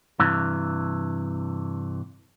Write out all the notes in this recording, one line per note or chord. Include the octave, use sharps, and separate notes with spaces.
G2 C3 E3